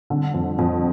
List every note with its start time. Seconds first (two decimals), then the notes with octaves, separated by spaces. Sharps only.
0.10 D3
0.34 F2
0.59 F2